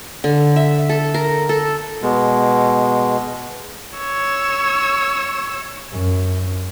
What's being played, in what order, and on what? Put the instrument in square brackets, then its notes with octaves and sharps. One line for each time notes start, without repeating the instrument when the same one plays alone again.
[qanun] D3
E5
A4
A#4
A4
[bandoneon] B2 G#3
[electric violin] C#5 E6
[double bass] F#2